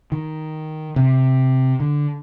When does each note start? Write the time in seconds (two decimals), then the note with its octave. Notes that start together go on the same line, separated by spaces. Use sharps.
0.12 D#3
0.96 C3
1.80 D3